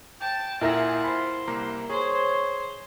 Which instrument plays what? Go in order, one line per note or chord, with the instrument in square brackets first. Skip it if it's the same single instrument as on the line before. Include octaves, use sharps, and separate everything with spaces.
[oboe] G5 [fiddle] A5
[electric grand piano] A#2 A#6 [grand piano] E4 A#4 E5 [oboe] F4 [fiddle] G#4 F#5
[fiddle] C5 [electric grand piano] B5
[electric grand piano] C2 A#3 A#5
[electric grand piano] G#4 [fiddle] C5 [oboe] C#5